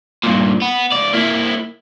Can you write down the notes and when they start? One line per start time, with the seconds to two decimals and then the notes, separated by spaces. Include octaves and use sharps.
0.24 G2 A#2
0.62 B3
0.93 C#2 D5
1.14 A#3 E4